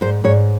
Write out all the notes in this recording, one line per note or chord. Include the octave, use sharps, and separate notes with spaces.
G#2 C5
G#2 C#5